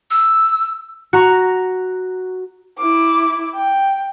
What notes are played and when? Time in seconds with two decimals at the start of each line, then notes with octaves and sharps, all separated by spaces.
0.11 E6
1.13 F#4 A#5 C#6
2.79 E4 D6
3.56 G5